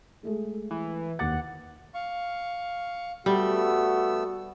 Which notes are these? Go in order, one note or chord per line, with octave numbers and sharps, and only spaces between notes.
G#3 A3 G#4
E3
D#2 F#5 D6 A6
F5 C#6
G3 A3 B3 F#4 E6